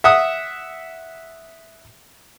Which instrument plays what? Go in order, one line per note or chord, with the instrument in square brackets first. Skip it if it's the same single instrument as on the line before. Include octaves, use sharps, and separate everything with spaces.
[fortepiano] E5 F#5 D#6